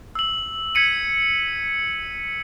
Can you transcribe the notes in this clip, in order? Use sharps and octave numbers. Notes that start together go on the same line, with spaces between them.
E6 F#7
G#6 B6 C#7 D#7